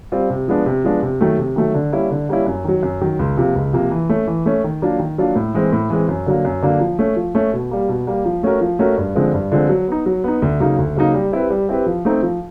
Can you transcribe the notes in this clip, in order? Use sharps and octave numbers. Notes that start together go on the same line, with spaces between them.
G3 C4 F4
C3
F3 G#3 B3 D4
C3
F3 G#3 B3 D4
C3
D#3 F#3 A3
C3
D#3 F#3 A3
D3
G3 A#3 C#4 E4
D3
G3 A#3 C#4 E4
F#2
D#3 F#3
F#2
D#3 F#3
C#2
C3 F3 A#3
C#2
C3 F3 A#3
E3
A3 C#4
E3
A3 C#4
D#3
F#3 A#3 D4 F4
D#3
F#3 A#3 D4 F4
A2
E3 G#3 C4
A2
E3 G#3 C4
F#2
D3 F#3 A#3
F#2
D3 F#3 A#3
F3
A3 C#4
F3
A3 C#4
B2
G3 A#3
B2
G3 A#3
F3
A3 C#4 F#4 A#4
F3
A3 C#4 F#4 A#4
G2
D3 F3 G#3 C4
G2
D3 F3 G#3 C4
F#3
B3 D#4
F#3
B3 D#4
D2
C#3 F#3 A#3 D#4
D2
C#3 F#3 A#3 D#4
G3
C4 E4 G4 B4
G3
C4 E4 G4 B4
F3
A3 C4 D#4
F3